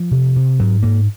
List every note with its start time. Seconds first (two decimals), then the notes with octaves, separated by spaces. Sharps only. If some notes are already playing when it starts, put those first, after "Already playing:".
Already playing: F3
0.11 C3
0.36 C3
0.59 G#2 F#3
0.82 G#2 A#3